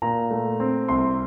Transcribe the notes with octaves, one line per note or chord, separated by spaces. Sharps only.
A#2 A#5
A3
C4
C2 C6